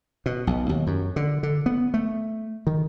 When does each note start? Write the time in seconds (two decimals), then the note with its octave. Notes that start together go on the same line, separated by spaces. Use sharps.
0.26 B2
0.47 B1
0.69 D#2
0.87 F#2
1.16 D3
1.43 D3
1.66 B3
1.94 A3
2.67 D#3